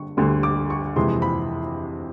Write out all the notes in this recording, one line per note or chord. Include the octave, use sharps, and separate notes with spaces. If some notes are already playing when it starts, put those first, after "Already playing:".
Already playing: D3 G3 C#6
D2 D3 G3 C6
D6
C#6
F2 C3 E3 G#3 C6
B5